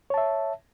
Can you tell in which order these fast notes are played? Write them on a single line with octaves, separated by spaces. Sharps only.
C#5 A5 E5